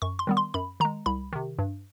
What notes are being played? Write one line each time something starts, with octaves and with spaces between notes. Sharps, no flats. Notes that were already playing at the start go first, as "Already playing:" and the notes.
F#2 C#6
C6
D#3 G3 B3
C6
F#2 B5
D#3 G#3 A#5
C2 B5
C3 D#3
G2